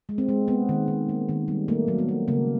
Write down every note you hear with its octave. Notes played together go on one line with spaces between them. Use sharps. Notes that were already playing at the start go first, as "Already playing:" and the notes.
G#3
C4
G#3
A#3 B3
D#3
D#3
A#3
D#3
G3
A3 A#3
F#3
B3
A3
C#3 A#3